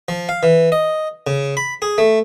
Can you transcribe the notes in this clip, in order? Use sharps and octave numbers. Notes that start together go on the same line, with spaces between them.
F3
F5
E3
D#5
C#3
B5
G#4
A3